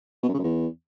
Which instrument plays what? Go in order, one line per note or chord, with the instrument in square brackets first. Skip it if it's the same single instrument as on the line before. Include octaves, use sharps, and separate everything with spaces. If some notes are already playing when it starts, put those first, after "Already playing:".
[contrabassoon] B2
F#2
C#3
F#2
E2